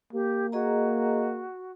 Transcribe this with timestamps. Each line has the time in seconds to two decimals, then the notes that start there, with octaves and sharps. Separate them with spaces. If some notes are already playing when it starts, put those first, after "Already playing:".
0.13 A#3 G4
0.52 F#4 G#4 D#5 A#5